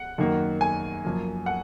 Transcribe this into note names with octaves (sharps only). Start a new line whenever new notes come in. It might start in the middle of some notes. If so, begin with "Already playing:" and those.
Already playing: F#5
F#2 D#3 A#3
G#5
F#2 F3 A#3
F#5